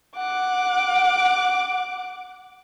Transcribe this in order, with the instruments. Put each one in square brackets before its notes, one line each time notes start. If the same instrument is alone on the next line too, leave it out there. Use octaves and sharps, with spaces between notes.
[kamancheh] F#5 D6